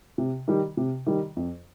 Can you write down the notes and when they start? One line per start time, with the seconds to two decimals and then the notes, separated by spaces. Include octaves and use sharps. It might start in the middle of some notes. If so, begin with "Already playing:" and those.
0.18 C3
0.48 D#3 G3
0.77 C3
1.06 D#3 G3
1.37 F2